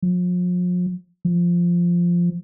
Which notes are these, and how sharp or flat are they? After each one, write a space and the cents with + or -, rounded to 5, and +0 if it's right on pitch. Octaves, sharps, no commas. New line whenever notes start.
F3 +40
F3 -5